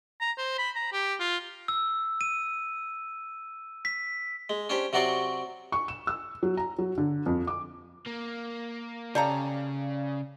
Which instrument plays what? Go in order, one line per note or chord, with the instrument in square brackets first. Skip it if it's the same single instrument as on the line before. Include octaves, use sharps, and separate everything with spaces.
[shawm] A#5
C5
B5
A#5
G4
F4
[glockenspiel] E6
D#7
B6
[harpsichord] G#3
C#4 D4 G4 C5
C3 F#3 F#4 D5 C6 C#6
[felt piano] C#6
E7
E6
F#3
A#5
F#3
D3
F2
D6
[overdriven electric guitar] A#3
[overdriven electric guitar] C#3 [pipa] G4 A4 A#5 [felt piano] D5 F5